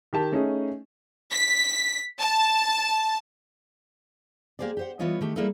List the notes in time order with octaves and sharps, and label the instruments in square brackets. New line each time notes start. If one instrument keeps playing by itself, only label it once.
[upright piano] D#3 G4 A5
A3 C#4 D#4 G#4
[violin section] B6
A5
[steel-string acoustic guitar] A#3 G4 G#4 C5 D5
G4 C5 F#5
E3 G3 B3 F4 C#5 D#5
D#3 A3 G4
G3 A#3 E4 G#4 A4 B4